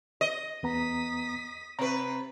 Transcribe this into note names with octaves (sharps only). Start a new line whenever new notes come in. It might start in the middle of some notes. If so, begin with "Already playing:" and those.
D#5
E2 B3 A#5 D#6 B6
C3 B4 A#5